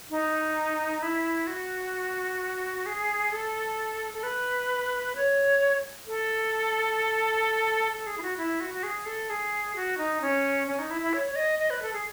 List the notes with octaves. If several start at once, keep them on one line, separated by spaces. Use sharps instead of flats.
D#4
E4
F#4
G#4
A4
A4
B4
C#5
A4
A4
G#4
E4
F#4
E4
F#4
F#4
G#4
A4
G#4
F#4
D#4
C#4
C#4
D#4
E4
E4
C#5
C#5
D#5
D#5
B4
A4
G#4